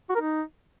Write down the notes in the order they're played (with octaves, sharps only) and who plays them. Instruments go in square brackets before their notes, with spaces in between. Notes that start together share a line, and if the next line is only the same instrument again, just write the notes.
[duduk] F#4
A#4
D#4